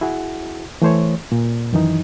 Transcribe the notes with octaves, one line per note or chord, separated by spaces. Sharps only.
E4 F#4 G#4 F#5
E3 A3 C5 C#5
A#2
F#2 D#3 E3 D#4